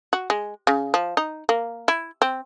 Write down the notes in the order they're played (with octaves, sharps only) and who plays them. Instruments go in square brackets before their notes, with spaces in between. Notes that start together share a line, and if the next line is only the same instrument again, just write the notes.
[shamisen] F#4
G#3
C#3
F3
D#4
A#3
E4
C4